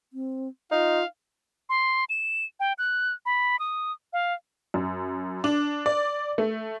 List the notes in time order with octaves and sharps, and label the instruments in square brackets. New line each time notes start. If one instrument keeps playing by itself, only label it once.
[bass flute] C4
[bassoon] D#4 [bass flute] F4 [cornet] F5
[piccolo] C6
E7
G5
F#6
B5
D#6
F5
[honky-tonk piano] F#2
D4
D5
A3